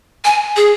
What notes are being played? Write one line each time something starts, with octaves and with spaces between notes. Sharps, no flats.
G#5
G#4